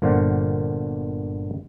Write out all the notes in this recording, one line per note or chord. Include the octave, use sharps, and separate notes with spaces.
G1 A#2 D3 C5 F5 F#5